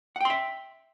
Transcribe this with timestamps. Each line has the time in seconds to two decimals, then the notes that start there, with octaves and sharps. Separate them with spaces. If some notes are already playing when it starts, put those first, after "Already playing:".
0.16 F#5
0.21 G5
0.25 C6
0.30 E5